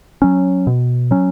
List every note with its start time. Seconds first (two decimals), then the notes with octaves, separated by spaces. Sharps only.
0.22 F#3 C#4
0.67 B2
1.11 F#3 C#4